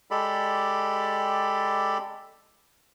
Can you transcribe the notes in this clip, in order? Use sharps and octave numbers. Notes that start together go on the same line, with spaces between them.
G#3 G4 A4 D5 B5